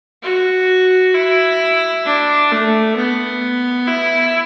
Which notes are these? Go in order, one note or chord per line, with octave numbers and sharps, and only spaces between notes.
F#4
E4
D4
A3
B3
E4